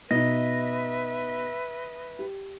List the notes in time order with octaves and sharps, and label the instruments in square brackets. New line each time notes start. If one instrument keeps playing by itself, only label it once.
[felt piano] B2 D#4 [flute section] B4 E5 [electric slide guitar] D#5
[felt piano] G4